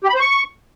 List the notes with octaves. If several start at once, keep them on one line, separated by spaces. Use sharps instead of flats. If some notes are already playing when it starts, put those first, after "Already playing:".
G4
B5
C5
C#6